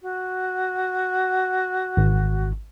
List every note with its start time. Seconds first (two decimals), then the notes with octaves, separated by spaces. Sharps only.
0.02 F#4
1.97 G#1